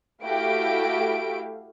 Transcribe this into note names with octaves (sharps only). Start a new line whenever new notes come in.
A3 E4 F#4 G4 F5 D7